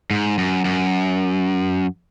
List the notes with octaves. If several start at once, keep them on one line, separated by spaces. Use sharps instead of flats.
G#2
F#2
F#2